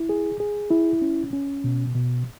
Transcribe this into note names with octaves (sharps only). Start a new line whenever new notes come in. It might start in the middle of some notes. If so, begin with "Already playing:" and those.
Already playing: E4
G#4
G#4
E4
C#4
C#4
B2
B2